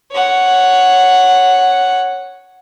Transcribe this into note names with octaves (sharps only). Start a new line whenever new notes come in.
C#5 F#5